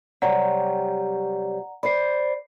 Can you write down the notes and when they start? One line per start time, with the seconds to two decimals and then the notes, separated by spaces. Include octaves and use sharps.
0.22 C3 F#3 G3 D5 F#5 A#5
1.83 C5 D5 B5 C7